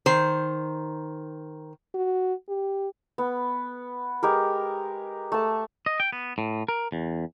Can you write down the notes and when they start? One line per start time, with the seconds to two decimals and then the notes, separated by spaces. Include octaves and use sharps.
0.06 D#3 C5
1.94 F#4
2.48 G4
3.18 B3
4.23 G#3 G4 A#4
5.32 A3 A5
5.86 D#5
6.00 G5
6.13 B3
6.38 A2
6.68 A#4
6.92 E2